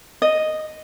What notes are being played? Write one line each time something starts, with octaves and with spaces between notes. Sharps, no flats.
D#5